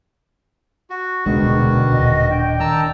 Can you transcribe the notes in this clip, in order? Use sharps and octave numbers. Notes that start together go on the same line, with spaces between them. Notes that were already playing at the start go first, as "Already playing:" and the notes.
F#4
D#1 C#2 B2 D3 D#3 G#3 F#4
D#1 D#5
D4 G5
D#3 A5 A#5 E6